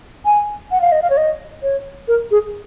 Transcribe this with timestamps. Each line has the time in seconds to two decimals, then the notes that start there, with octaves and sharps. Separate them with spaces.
0.25 G#5
0.72 F#5
0.81 F5
0.92 D#5
1.02 F5
1.10 C#5
1.17 D#5
1.63 C#5
2.08 A#4
2.31 G#4